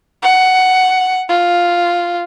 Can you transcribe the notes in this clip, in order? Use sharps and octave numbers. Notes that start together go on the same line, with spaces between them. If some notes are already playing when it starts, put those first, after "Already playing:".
F#5
F4